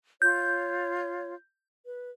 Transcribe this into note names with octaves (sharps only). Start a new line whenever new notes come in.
F4 C#5 G6
B4